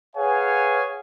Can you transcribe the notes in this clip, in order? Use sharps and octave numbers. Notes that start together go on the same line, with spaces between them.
G#4 B4 C#5 F5 F#5 G#5